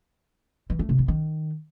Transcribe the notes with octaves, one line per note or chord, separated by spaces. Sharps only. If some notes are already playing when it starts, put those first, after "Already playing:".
E3
A3
C3
B3
D#3